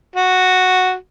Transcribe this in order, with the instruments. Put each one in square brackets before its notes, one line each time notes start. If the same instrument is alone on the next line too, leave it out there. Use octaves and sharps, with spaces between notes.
[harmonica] F#4